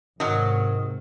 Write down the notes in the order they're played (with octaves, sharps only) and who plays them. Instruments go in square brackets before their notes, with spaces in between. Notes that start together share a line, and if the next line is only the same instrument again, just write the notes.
[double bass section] G#2 C3 [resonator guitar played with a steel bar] D#3 F#3